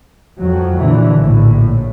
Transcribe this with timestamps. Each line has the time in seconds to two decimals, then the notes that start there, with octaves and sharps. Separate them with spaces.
0.41 F2 F#3
0.78 A#2 D3 E3
1.15 A#1 A2